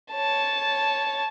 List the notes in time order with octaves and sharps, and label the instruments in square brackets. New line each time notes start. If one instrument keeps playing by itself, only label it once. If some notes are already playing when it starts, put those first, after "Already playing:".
[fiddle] C#5 A5